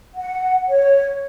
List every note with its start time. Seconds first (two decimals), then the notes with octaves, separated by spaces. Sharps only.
0.14 F#5
0.67 C#5